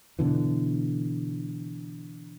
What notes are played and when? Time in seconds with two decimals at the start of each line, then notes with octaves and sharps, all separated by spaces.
0.19 B2 D3 E3